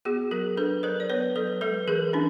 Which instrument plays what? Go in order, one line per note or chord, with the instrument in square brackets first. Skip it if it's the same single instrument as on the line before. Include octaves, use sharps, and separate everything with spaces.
[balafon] B3 F#4 G#4
F#3 G#4 A#4
D4 A4 B4
F#3 A#4 C5
D5
B3 B4 C#5
F#3 A4 B4
G#3 A4 B4
E3 G#4 A#4
C#4 D4 E4